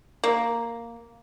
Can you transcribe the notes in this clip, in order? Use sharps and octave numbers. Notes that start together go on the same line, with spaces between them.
A#3